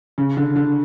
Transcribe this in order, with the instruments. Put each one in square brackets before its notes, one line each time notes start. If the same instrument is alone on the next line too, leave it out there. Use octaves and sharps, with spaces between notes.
[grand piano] C#3
D3
D3